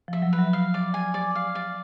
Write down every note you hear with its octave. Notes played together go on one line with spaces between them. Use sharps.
F3 E5
F#3
B4
F#3
F5
D5
G#5
D5
F5
D5